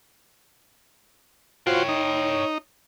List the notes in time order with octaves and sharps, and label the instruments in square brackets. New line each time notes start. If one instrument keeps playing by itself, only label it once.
[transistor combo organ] F4 F#4 C5 [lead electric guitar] C#5 G5
[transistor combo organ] D#4